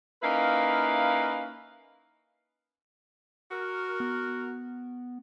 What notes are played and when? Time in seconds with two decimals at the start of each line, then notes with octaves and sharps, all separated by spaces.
0.23 A#3 C#4 D#4 E4 B4 F5
3.52 F#4 A#4
4.00 B3